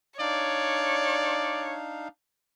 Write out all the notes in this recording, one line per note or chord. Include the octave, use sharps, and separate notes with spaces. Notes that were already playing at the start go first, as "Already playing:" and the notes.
D4 D#4 C#5 D5 F5